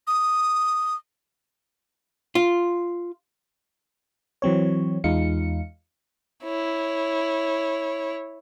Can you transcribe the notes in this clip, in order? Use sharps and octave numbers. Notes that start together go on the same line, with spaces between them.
D#6
F4
E3 F#3 C4 C#5
E2 G#3 D#4 F4 F5 C#7
E4 C#5